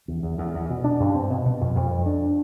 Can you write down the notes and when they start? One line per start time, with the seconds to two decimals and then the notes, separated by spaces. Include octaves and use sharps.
0.08 E2
0.23 E2
0.38 E2
0.54 E2
0.70 B2
0.84 D4
1.00 G2
1.15 C4
1.30 B2
1.45 B2
1.61 F2
1.75 F2
1.91 G2
2.06 D4